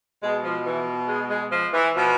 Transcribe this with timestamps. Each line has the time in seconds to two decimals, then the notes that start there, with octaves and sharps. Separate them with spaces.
0.22 B2 G#3
0.44 F3
0.66 E3
1.08 G#3
1.30 G#3
1.52 F3
1.73 E3
1.95 B2 F3